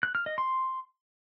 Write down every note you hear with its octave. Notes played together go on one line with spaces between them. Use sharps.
F#6
F6
D#5
C6